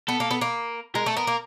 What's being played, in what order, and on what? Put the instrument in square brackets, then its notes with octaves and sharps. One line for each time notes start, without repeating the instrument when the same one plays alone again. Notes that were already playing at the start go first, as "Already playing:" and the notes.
[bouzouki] B3 [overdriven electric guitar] A4
[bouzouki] A#3
B3
A#3
[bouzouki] G#3 [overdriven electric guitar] A#4
[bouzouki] A3 [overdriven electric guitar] A4
[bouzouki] B3 [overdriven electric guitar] A#4
[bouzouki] A#3